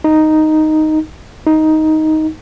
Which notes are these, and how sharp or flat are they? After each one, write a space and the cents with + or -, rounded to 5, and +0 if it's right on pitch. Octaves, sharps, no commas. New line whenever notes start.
D#4 +0
D#4 +10